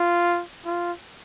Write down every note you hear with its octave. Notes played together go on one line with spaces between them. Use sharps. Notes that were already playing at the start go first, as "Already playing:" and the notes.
Already playing: F4
F4